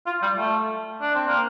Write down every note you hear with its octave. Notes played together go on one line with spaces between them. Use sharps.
F4
G3
A3
D4
C4
A#3